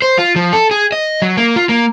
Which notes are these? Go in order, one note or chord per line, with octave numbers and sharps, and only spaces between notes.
C5
F4
F3
A4
G#4
D#5
F#3
A#3
F4
A#3